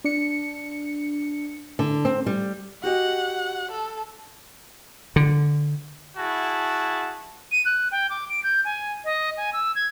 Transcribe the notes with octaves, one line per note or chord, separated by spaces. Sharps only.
D4 C#7
D3
C4
G3
F#4 G4 D#5 F#5
A4
D3
E4 F#4 G#4 A5
D#7
F#6
G5
D6
D7
G6
G#5
D#5
G#5
E6
G#6